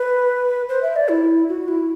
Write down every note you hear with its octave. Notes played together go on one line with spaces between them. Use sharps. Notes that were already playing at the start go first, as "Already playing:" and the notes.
Already playing: B4
C5
E5
D5
E4
F#4
E4